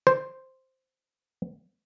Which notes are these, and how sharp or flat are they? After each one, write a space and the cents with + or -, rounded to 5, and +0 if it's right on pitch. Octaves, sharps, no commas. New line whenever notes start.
C5 +0